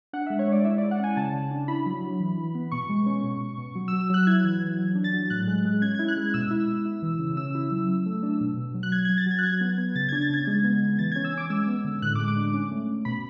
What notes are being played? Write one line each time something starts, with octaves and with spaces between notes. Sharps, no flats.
D4 F#5
G#3 E5
C#5
G#3 D5
E4 E5
D5
E4
F#5
C#4 G#5
C#3 A5
C#3
D4
E4 B5
F#3
F#3
E3
E3
B3
B2 C#6
G#3
C#4
B2
B2
B2
F#3
E6
F#3
E6
F#3 F#6
E4 G#6
E3
E3
F#3
D4
A6
F#3
A2 F#6
G#3
G#3
C#4 G#6
G#6
E4
F#6
G#3
B2 E6
E4
B2
E4
E3
C#3
C#4 E6
E4
F#3
F#3
A3
D4
B2
B2
F#3
F#6
F#3 G#6
F#3 G#6
A6
F#3 G#6
F#6
F#3 G#6
B3
B3
C#3 A6
D4 G#6
A6
C#3 G#6
G#3
B3
B3
E3 A6
G#6
C#4
E6
C#4 D6
G#3 E6
B3
D3
A2 F#6
D6
G#3
D6
D4
C#4
A3
A3
B2 B5